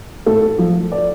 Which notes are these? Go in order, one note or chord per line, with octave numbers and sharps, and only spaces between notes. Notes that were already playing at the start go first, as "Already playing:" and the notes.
A2 A4
F3
D5